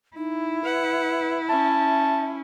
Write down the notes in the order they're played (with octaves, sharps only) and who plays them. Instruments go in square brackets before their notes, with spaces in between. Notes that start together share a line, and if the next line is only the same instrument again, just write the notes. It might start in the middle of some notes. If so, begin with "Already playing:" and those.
[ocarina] D#4 [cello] E4
[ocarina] B4 [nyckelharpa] F#5
[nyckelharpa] C#4 [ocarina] E5 [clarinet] A5